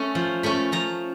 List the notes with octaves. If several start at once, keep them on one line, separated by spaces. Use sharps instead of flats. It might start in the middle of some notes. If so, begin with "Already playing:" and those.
Already playing: A3 C#4
F3
A3 C#4 B5
F3 A#5